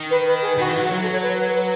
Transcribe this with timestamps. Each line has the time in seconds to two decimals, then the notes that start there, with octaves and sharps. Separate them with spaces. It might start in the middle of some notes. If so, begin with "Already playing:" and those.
Already playing: D#3
0.10 B4
0.26 B4
0.41 G#4
0.58 D#3 F#4
0.69 E3
0.74 F#4
0.80 F#3
0.90 F#3 F#4
1.01 A4
1.12 C#5
1.22 B4
1.37 B4
1.54 B4